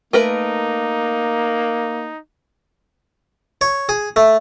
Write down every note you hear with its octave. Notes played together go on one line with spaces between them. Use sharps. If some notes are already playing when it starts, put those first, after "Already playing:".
A3 A#3 D#4 A#4 B4
C#5
G#4
A3